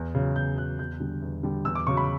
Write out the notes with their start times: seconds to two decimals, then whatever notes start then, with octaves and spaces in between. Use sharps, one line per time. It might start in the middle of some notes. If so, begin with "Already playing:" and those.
Already playing: E2
0.15 C#3 F#3
0.36 E2 G6
0.58 C#3 F#3 F#6
0.79 E2 G6
1.00 D3 G3
1.22 E2
1.43 D3 G3
1.65 E2 E6
1.75 D6
1.87 C#3 F#3 C#6
1.97 B5